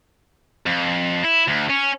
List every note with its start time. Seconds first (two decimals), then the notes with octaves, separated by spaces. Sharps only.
0.66 F2
1.25 E4
1.48 D2
1.70 C#4